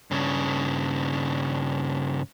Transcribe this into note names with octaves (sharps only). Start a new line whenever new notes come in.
G2 C#3